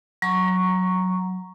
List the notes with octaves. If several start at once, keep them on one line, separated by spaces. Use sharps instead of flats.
F#3 A#5 C#6